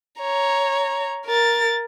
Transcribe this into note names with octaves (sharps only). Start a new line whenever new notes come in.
C#5 A#5
A#4 A6